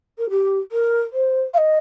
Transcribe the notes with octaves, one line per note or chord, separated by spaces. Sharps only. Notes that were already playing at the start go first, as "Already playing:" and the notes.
A#4
G4
A#4
C5
F5
D#5